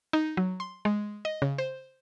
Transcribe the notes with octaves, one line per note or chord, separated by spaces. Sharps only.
D#4
F#3
C6
G#3
D#5
C#3
C5